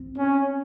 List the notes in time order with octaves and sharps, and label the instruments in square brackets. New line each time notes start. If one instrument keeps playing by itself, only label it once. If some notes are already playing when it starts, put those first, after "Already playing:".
Already playing: [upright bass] C4
[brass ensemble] C#4